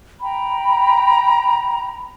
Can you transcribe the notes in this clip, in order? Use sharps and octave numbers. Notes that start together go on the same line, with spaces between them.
G5 A#5 B5